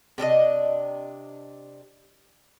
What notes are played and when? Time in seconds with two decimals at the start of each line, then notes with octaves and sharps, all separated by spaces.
0.18 C3 D4 A4 D#5